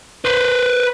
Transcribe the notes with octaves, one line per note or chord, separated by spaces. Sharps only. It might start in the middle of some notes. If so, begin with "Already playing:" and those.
B4 C5